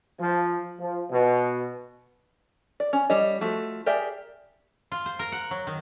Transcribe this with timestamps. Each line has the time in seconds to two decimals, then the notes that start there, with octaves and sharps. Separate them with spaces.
0.20 F3
0.80 F3
1.11 B2
2.80 D5
2.93 C#4
3.10 G3 C#5 D#5
3.41 F3 A3 F#4
3.86 G4 G#4 A#4 D5 E5
4.92 F4
5.06 C5
5.19 A#4
5.32 F#5
5.51 F#3
5.67 D#3